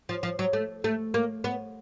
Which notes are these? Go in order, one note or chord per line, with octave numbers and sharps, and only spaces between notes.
F3
F3
F#3
A3
A3
A#3
B3